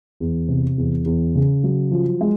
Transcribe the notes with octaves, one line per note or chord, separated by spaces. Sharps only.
E2
C3
E2
E2
C#3
F#3
F3
G#3